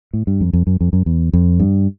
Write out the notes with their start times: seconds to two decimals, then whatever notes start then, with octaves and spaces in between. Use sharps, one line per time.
0.13 A2
0.27 G2
0.41 F2
0.53 F2
0.67 F#2
0.81 F2
0.93 F#2
1.06 E2
1.33 F2
1.60 G2